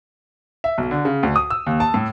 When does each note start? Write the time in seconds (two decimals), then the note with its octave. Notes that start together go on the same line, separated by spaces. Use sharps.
0.64 E5
0.78 B1
0.91 D3
1.05 C#3
1.23 D2
1.36 D#6
1.50 E6
1.66 D#2
1.80 A5
1.94 A2